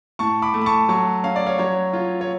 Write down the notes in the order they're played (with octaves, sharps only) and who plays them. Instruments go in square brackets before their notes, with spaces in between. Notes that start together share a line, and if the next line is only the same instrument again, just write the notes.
[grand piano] A2 A5 C#6
B5 D6
A3
B5
A5 C#6
F#3 A5 C#6
C#4 F5
D5
C#5 F5
F#3 C#5
F4
C#5